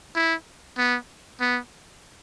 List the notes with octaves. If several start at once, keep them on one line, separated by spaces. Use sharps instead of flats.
E4
B3
B3